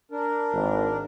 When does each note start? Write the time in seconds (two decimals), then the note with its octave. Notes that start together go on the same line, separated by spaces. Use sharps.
0.11 D4 A#4
0.53 G#1